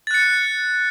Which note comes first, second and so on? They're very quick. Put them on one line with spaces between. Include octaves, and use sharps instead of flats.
A6 F#6 C#7